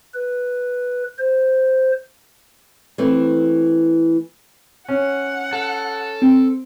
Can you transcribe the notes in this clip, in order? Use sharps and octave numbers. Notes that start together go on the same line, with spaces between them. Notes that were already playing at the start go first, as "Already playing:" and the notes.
B4
C5
E3 A3 C4
C#4 F#5
A4
C4